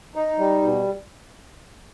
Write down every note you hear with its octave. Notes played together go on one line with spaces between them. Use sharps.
D#4
G3
B2